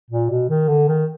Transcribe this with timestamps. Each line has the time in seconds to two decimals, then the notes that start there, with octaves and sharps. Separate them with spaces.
0.10 A#2
0.30 B2
0.49 D#3
0.68 D3
0.88 D#3